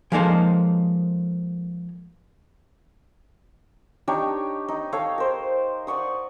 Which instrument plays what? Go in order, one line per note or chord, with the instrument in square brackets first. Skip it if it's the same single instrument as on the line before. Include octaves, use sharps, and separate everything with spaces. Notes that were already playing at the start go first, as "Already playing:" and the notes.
[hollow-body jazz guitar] F3 G#3 A#3 D#4 A4 C5
[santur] D4 D#4 G4 C#5
D#4
A4 C#5 F5
A#4 C5
D5 F#5 C#6 D#6